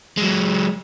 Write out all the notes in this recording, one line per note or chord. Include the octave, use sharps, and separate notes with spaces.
F#3 G#3